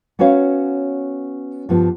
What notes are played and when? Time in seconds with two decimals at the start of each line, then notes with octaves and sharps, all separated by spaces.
0.19 B3 C#4 F#4 B4 C#5 F5
1.69 G2 F3 B3